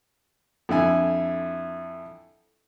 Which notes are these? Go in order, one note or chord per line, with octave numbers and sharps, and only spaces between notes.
F2 D3 E4 G#5